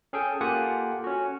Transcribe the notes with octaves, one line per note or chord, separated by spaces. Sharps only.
C#4 G#4 A4 G5
A#3 F4 G4 A4 F#5 G#5
C#4 F#4